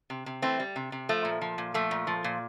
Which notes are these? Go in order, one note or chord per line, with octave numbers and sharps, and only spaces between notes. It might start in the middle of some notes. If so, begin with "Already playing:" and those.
C3
C3
E3 A3 C4
G3
C3
C3
F3 A3
A#2
F3
A#2
F3 A3
A#2
F3
A#2